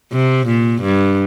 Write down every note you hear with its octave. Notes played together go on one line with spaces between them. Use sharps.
C3
A#2
G2